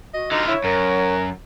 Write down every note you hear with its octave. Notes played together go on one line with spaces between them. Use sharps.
F#4 D#5
D3 D#4 F4
E4 C#5
F#2 A#4